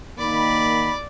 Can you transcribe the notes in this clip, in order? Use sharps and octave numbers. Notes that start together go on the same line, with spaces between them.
D#3 A#3 D5 B5